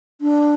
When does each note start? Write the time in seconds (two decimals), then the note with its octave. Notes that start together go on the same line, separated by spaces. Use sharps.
0.21 D4